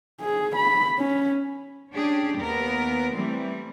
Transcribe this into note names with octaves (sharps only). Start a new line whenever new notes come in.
G#4
B5
C#4
C#4 D4 G4 G#4
D#2 B3 A#4
E3 G3 A3 C4